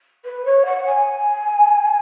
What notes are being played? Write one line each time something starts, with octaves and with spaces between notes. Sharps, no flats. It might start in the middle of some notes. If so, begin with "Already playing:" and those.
B4
C#5
F#5
G#5